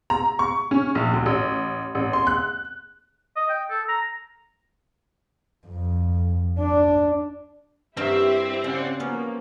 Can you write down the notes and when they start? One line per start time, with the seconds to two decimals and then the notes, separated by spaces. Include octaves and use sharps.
0.10 A#5
0.39 C#6
0.71 C#4
0.95 A#1
1.14 D2
1.26 A1
1.95 A1
2.13 C6
2.27 F#6
3.36 D#5
3.49 G5
3.70 A4
3.88 A#5
5.67 F2
6.59 D4
7.97 G2 C4 E4 F#4 G4 A#4 E5
8.64 C#3 D5 F#5
9.00 F3 A#3 B3 C#4